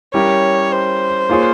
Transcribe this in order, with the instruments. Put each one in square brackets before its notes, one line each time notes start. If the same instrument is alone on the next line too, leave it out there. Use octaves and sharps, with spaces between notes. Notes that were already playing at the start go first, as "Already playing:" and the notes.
[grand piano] G3 C#4 E4 G4 A#4 [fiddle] C#5
[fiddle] C5
[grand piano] A#3 F4 G#4 C#5